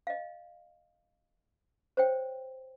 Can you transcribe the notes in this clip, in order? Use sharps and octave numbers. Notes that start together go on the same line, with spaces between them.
D#5 F5
C5 C#5 G5